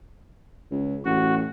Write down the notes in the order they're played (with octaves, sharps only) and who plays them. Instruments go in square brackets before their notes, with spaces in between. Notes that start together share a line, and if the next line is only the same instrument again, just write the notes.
[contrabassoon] C#2
[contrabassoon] A1 [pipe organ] F#4